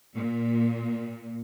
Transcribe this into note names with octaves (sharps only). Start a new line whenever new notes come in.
A#2